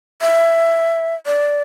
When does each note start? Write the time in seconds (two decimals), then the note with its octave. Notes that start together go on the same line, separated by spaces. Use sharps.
0.21 E5
1.26 D5